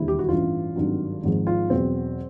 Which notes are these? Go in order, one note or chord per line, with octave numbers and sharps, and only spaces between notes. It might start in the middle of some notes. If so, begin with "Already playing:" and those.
Already playing: E1 D#2 D3 G3 E4
G4
F#4
A1 G2 E3 F4
G#1 G2 D#3 F#3
G#1 G#2 F3
F4
E2 B2 F#3 C4